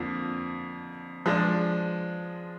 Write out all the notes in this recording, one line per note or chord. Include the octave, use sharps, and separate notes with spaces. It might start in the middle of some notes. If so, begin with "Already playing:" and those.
Already playing: F2 D3 F3 A#3
F3 G#3 D4